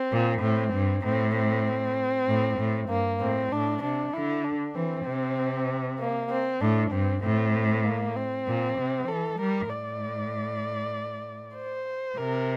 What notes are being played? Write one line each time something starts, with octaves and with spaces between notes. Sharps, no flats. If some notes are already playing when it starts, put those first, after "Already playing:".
Already playing: C4
A#2
A2 C4
G2
A2 C4
C4
A2
A2
G2 A#3
A2 C4
A2 D4
C3 D4
D3 E4
D4
E3 C4
C3
A#3
C4
A2 D4
G2 C4
A2 C4
A#3
C4
A#2
C3
E3 A4
G3 A#4
A2 D5
C5
C3 A#4